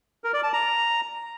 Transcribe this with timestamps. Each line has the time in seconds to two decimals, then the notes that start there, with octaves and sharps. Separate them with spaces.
0.24 A#4
0.34 D5
0.43 A5
0.53 A#5